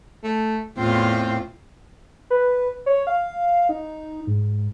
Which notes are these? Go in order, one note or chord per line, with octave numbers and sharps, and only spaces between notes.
A3
E2 A2 C4 F4
B4
C#5
F5
D#4
G#2